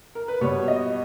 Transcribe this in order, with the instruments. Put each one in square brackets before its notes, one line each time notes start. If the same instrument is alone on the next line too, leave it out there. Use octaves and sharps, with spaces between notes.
[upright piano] A#4
B4
B2 G3 C#5
D#5